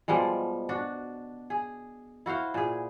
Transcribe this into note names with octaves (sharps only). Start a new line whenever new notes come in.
B2 F3 G3 G#3
D4 F#4
G#4
E4 F#4 C5 F5
A#2 G#4